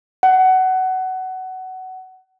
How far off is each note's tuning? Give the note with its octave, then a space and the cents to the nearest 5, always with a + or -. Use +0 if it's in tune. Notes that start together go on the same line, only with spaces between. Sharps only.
F#5 +20